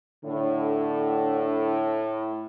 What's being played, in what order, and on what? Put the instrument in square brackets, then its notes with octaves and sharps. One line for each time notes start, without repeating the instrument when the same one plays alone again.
[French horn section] A2 [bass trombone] D3